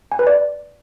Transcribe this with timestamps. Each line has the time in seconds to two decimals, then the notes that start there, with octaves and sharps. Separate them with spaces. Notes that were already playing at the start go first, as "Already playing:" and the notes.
0.12 G#5
0.19 B4
0.27 D5